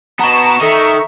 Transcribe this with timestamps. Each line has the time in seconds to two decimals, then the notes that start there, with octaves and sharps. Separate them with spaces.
0.20 B2 B3 A5 A#5 C#6 E7
0.61 D#3 A4 E5 C#7